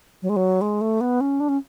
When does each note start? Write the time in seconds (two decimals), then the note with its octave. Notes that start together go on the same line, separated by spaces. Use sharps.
0.22 F#3
0.29 G#3
0.36 F#3
0.61 G#3
0.81 A3
1.01 B3
1.21 C#4
1.40 D4
1.49 C#4